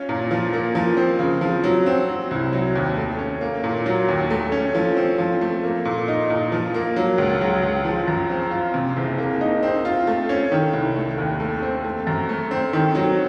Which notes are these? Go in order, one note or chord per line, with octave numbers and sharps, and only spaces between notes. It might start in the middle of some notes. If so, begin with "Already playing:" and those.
Already playing: C#4 F4
A#2
F3
A#3
F3
C4
C#3
F3
F#3
C4
F#3
C2
F#3
D#2
A3
C#4
A#3
A#2
F#3
D#2
A3
C#4
F3
C4
F3
A3
A#3
A#2
D#4
A#2
F3
A#3
F#3
C#2
F#3
C#2
F3
F#2
C4
F4
C3
F#1
A#3
D#4
C4
F4
A3
C#4
D#3
C2
A3
D#2
A3
C4
A3
F#2
A3
C4
D#3
F#3